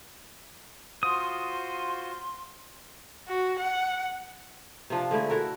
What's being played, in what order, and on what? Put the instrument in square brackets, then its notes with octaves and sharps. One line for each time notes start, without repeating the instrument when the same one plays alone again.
[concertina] F4 F#4 C5 [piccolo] C6 [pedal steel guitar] D#6
[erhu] F#4
F#5
[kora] C3 F3 D4
D3 G#3 A3 E4
E4 F#4 A4 A#4